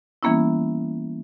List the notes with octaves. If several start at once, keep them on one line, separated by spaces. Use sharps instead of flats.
E3 G3 A#3 B3 C#4 E4